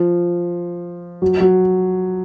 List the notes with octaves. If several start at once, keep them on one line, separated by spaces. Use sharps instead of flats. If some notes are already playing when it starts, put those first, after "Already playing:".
Already playing: F3
F#3
F#3